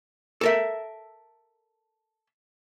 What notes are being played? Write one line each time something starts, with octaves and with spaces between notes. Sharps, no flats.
A4 A#4 E5